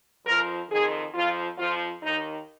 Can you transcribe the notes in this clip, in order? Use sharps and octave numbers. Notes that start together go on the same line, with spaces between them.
F2 F3 A#4
F2 D#3 G#4
F2 F3 F4
F2 F3 F4
D#2 D#3 D#4